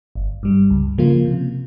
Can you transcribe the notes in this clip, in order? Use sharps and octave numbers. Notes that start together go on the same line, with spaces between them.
G1
G2 G3
C#2
C#3 F3 A#3 F4
C3